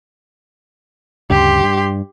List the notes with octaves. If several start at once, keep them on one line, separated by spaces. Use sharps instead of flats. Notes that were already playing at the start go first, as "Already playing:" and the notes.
D2 G2 C#3 G4 C6
G2